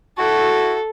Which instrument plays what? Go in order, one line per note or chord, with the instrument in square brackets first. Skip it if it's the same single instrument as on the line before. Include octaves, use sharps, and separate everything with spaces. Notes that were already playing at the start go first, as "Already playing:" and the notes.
[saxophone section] E4 F#4 [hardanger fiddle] A4